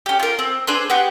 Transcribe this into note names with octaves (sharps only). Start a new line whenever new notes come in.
C#4 G4
F4 A#4
C4
D4 G#4 B4 C5
B3 F#4 G4 B4